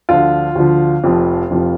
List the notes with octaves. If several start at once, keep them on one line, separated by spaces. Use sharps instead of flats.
D2 D3 F3 F4
D2 D3 F3
F1 F2 F3
F1 F2 F3